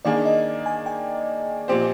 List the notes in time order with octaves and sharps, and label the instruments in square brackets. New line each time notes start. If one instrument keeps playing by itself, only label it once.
[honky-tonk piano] D#3 A#3 D4 G#4 [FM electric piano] D5
[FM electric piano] D#5
G#5
G5
[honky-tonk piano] A#2 F3 C4 G4 C5